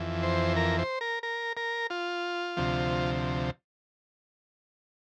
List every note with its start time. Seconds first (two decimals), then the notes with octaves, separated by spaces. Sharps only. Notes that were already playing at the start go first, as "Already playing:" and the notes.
Already playing: F2 E3
0.23 C5
0.56 A#4
0.79 C5
1.01 A#4
1.23 A#4
1.57 A#4
1.90 F4
2.57 D2 C3 F3